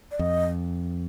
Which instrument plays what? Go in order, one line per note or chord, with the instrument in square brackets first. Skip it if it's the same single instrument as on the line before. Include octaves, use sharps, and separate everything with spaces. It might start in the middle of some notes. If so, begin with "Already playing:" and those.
[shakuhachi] D5
[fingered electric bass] F2 [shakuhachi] D#5